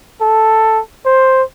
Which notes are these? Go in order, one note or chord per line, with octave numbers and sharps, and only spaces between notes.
A4
C5